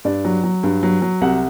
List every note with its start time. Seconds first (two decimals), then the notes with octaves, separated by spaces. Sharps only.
0.05 G2 D5
0.25 F#3
0.44 F#3
0.63 G2
0.83 F#3
1.02 F#3
1.21 C2 F#5